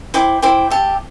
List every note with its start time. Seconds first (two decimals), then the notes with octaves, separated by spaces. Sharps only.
0.14 E4 C5 G5 D6
0.42 E4 C5 G5 D6
0.70 G4 E5 A5